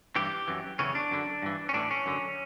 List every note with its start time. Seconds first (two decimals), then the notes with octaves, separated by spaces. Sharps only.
0.16 G2 E3 G4
0.48 F#2 E3
0.79 E2 C#3 E3 C#4
0.95 D4
1.11 F#2 D3
1.42 G2 E3
1.69 C#4
1.74 A2 E3 D4
1.91 C#4
2.06 F#2 D3